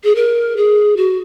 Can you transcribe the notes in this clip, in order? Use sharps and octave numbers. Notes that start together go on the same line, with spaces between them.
G#4
A#4
G#4
F#4